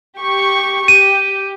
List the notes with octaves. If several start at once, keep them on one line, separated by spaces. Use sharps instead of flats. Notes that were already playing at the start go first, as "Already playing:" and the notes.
G4 C#6
G4 D#7